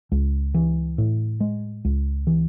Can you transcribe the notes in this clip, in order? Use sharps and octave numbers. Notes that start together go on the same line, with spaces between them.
C#2
E3
A2
G#3
C#2
E3